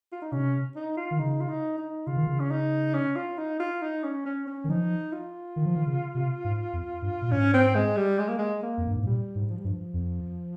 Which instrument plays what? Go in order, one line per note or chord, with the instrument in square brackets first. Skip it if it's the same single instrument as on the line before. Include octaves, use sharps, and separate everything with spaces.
[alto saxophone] F4
D#4
[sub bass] C3 [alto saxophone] C#4
[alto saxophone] D#4
F4
[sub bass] D#3
[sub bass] C#3 [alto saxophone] D#4
[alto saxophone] F4
D#4
D#4
[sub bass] C#3 [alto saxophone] F4
[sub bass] D#3
C#3
[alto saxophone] C#4
D#4
C#4
F4
D#4
F4
D#4
C#4
C#4
C#4
[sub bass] D#3
[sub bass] F3 [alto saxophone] D#4
[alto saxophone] F4
[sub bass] D#3
F3
D#3
C#3
C3
G#2
F2
G2
A#2
[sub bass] G#2 [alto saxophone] C#4
[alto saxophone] C4
G#3
G3
G#3
A#3
G#3
A#3
[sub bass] F2
G2
G#2
[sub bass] A#2 [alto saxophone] G3
[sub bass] G#2
[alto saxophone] F3
G3
[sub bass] G2 [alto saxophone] F3
[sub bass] F2